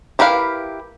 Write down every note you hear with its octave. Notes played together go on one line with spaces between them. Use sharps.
E4 G4 A#4 B4 F5